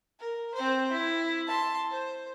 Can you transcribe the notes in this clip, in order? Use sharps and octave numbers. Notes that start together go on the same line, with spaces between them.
A#4
C4 C5
E4
A5 C6
C5